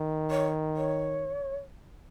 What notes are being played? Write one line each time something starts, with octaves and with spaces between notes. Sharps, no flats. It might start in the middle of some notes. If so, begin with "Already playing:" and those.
Already playing: D#3
C#5
C#5